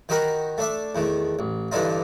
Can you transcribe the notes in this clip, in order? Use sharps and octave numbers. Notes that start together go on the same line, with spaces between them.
D#3 D#4 F#4 G4 A#4 B5
A3 D4 E5
E2 D#3 A3
A1
G2 D3 E3 D4 D#4 F4